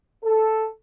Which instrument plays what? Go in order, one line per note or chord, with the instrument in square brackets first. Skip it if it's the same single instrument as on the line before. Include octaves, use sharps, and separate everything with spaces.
[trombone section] A4